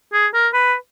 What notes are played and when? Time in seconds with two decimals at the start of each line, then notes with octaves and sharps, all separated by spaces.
0.13 G#4
0.34 A#4
0.53 B4